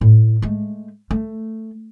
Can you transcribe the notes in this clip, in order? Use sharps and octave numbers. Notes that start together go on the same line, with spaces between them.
A2
G#3 A3
A3